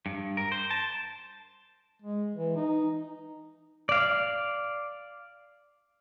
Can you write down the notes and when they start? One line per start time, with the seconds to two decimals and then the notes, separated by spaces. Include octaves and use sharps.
0.06 G2
0.37 A#4
0.52 C5
0.71 A5
2.02 G#3
2.35 E3
2.56 D#4
3.89 D5 F5